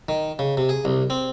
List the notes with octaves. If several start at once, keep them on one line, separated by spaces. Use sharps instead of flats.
D#3
C#3
C3
G#4
C2
C4